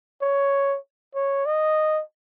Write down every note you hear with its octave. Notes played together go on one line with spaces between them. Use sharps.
C#5
C#5
D#5